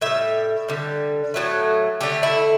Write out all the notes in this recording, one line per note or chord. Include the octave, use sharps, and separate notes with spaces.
A2 G3 E5
D3 G3
A2 F#3 A3
D3 A3 G4
E4